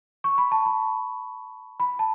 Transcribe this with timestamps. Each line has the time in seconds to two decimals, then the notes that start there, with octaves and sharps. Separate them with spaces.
0.24 C#6
0.38 B5
0.52 A5
0.66 B5
1.80 B5
1.99 A5